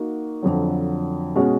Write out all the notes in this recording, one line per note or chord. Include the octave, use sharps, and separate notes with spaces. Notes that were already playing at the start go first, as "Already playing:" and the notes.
Already playing: A#3 D#4 F#4
F2 D3 F#3
B2 G#3 C#4 F#4